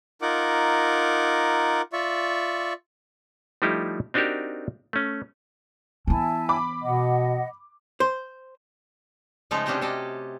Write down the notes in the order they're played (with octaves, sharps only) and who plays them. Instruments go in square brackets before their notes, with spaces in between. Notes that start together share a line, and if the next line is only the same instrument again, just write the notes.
[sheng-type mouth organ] D#4 F4 A#4 F#5 D6
F4 D5 E5 C#6
[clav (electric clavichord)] F3 G3 A3 D#4 E4 G4
C4 D4 D#4 F#4 G4 A#4
A3 C#4
[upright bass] E3 B3 [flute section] E4 G#5 A5
[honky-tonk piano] B5 D6
[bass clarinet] B2 [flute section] D#5 F#5
[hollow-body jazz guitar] C5
[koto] C#3 F3 G#3 A3 D#4
C3 C#4 D4 F#4 G4 D#5
C3 C#4 A4 D#5